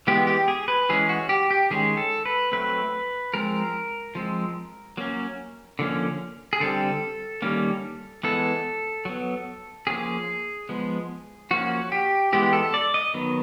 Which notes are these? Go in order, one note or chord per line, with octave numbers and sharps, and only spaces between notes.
E3 G#3 B3 G4
G4
G#4
B4
E3 G#3 C#4 G#4
F#4
G4
G4
D#3 G#3 C#4 G#4
A4
B4
F#3 A3 C4 B4
F3 G#3 C4 A#4
F3 G#3 C4
F#3 A#3 C#4
D3 F3 A#3 C#4
G#4
D3 G3 C4 A4
D#3 G3 A#3 C#4
E3 G#3 B3 A4
F#3 B3
F3 A#3 C#4 G#4
F3 G#3 B3
F3 A#3 C#4 F#4
G4
E3 G#3 B3 G4
A4
D5
D#5
D#3 F#3 B3